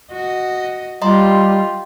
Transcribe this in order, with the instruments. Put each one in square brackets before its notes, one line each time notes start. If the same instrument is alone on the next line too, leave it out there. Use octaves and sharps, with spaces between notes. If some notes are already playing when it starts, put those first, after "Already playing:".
[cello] F#4 D#5
[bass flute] G3 [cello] F4 G4 [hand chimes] D#5 A#5 C6